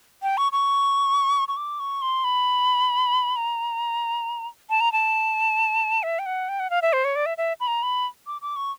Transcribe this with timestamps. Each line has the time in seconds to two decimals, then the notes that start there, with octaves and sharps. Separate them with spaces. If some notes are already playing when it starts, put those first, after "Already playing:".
0.23 G5
0.37 C#6
0.52 C#6
1.48 C#6
1.57 D6
1.80 C#6
2.02 C6
2.24 B5
3.36 A#5
4.70 A5
4.81 A#5
4.92 A5
6.03 E5
6.19 G5
6.26 F#5
6.49 G5
6.60 F#5
6.70 F5
6.82 E5
6.93 C5
7.05 C#5
7.16 D5
7.26 E5
7.38 E5
7.60 B5
7.67 A#5
7.83 B5
8.27 D6
8.42 D6
8.56 C#6